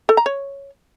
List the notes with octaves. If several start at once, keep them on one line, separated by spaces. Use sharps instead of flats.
A4
A#5
C#5